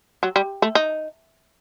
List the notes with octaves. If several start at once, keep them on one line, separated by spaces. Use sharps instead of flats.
F#3
G3
A3
D#4